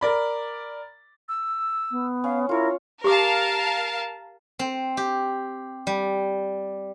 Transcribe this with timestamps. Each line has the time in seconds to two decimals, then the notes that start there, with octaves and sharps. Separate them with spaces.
0.01 A#4 D5 B5
1.28 E6
1.91 B3
2.24 C#4 F5
2.49 E4 F4 A#4 C#5
3.04 G4 A#4 F5 A5 D6
4.59 C4
4.97 G4
5.87 G3